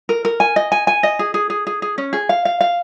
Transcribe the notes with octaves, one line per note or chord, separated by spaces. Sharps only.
A#4
A#4
G#5
D#5
G#5
G#5
D#5
G#4
G#4
G#4
G#4
G#4
C#4
G#4
F5
F5
F5